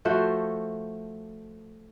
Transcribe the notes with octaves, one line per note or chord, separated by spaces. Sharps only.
F3 A3 F#4 C5